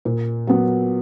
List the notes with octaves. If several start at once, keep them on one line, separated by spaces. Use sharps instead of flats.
A#2
F#3 B3